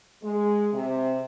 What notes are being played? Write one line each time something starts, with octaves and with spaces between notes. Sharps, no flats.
G#3
C3